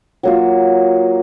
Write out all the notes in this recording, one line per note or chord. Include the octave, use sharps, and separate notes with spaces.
F#3 A#3 F4